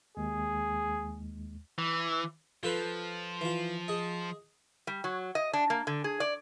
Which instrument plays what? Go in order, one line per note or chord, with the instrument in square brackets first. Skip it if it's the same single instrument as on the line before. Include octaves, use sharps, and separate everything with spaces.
[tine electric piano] D#2 G#3 [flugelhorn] G#4
[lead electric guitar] E3
[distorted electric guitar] F3 [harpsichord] F4 A4 B4
[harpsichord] E3 F4
G#4 D#5
[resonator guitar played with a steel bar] G3
F#3
D#5
D4
A#3
D3
G#4
D5